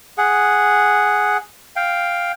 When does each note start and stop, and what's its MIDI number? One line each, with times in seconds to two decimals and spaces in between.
0.18 1.37 68
0.18 1.37 78
1.76 2.32 77
1.76 2.32 79